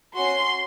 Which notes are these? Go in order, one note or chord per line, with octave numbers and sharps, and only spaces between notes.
C#4 F#4 C6